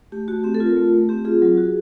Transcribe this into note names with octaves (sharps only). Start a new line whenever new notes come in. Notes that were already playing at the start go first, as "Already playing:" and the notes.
A3 G4
A3 F#4
C4 G4
A4
F4
A#4
A3
A3
C4 G4
F4 G#4
F#3
F#4